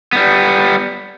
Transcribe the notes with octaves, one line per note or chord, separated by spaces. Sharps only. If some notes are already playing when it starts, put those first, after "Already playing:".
G3 B3